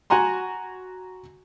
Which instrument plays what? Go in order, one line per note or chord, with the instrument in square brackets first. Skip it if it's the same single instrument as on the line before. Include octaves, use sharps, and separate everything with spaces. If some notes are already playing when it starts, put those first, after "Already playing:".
[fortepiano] F#4 F#5 G#5 A#5 C6